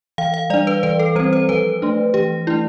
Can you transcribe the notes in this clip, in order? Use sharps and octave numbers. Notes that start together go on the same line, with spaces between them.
E3 F5
F5
G3 D4 D5
B4
E3 B4
A4
G3 C4 C5
C5
F3 B4
A3 D4
E3 G4
A3 D4 E4